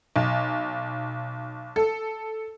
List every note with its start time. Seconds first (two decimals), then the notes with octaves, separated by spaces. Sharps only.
0.16 B1
1.76 A4